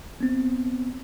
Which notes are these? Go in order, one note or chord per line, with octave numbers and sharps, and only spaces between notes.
B3 C4